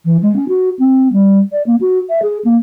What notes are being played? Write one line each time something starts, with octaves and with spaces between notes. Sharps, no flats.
E3
G#3
C#4
F#4
C4
G3
D5
A#3
F#4
E5
G#4
A#3